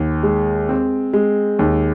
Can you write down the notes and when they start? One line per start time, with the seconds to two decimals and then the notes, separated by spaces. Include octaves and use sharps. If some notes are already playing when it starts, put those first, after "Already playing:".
Already playing: D#2
0.23 G#3
0.69 C4
1.13 G#3
1.59 D#2